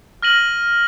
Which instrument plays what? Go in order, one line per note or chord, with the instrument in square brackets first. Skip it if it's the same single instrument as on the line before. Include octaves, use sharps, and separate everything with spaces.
[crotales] F6 A#6 D#7 F#7